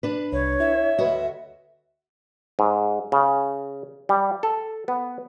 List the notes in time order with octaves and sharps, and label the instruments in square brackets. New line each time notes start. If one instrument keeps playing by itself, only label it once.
[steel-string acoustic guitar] D4 B4
[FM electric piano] C2 [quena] C#5
[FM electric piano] E4 [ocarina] E5
[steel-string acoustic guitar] D2 F#4 [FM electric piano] B4 C#5 D#5
[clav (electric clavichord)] G#2
C#3
G3
A4
B3